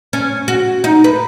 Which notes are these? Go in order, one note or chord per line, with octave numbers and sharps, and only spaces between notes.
C#4
F#4
D#4
B4